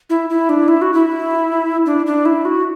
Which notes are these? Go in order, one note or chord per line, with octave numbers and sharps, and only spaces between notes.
E4
E4
D4
E4
F#4
E4
D4
D4
E4
F#4